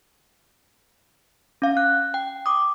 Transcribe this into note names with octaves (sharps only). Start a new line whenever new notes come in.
C#4 F5
F#6
G5
D6 D#6